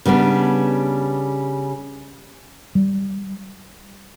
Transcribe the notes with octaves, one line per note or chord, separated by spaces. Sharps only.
C#3 G3 B3 D4
G3